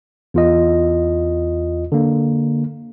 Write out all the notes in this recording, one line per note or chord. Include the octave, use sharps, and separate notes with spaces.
E2 F4 D#5
D3 A#3